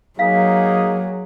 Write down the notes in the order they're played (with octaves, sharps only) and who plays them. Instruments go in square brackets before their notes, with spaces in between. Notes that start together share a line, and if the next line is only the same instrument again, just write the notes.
[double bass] F#3 [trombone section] A#3 D#4 G#4 [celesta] F5 B6